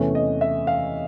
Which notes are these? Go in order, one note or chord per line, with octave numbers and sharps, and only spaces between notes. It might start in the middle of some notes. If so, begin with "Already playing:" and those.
Already playing: E2 C3 E3 A3 C#4
D#5
E5
F5